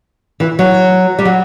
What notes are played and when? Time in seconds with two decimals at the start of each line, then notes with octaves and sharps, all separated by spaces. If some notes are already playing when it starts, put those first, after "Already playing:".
0.40 E3
0.59 F#3
1.19 G3
1.25 F#3